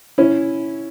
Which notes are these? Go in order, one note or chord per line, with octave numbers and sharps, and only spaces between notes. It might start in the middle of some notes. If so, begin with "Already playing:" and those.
C#4 E4